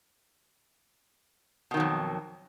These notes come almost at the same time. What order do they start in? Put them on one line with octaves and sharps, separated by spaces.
B2 D#3 F#3 F2